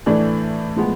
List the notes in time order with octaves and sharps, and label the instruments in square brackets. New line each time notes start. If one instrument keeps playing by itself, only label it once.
[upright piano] A2 E3 A3 D4
A2 F3 G#3 B3